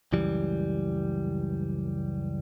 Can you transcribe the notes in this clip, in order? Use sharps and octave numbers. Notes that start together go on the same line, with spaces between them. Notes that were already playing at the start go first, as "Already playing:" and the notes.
C#2 F#2 E3 G3